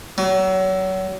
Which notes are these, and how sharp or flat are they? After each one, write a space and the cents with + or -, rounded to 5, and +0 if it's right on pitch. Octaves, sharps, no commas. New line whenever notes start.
F#3 +30